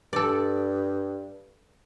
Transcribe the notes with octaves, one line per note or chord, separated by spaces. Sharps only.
G2 A4 D5